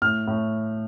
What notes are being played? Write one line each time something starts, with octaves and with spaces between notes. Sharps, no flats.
A2 F6
A2